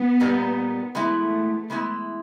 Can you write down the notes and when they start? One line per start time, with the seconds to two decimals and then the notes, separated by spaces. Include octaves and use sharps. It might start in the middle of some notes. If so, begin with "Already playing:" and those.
Already playing: B3
0.20 A#2 G3 A#3 D#4
0.94 E3 G#3 A3 B3 E4
1.70 E3 G#3 B3 E4